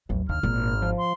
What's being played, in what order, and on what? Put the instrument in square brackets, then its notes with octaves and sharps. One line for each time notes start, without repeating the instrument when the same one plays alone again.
[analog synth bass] A1 [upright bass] D#2 F#3
[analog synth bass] D#2 [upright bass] D3 [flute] F6
[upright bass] G#1 [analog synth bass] A#2
[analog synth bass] F3
[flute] C6